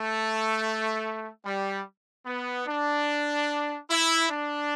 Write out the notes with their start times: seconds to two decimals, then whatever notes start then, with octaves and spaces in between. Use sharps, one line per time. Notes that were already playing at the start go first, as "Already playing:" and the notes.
Already playing: A3
1.45 G3
2.26 B3
2.67 D4
3.90 E4
4.31 D4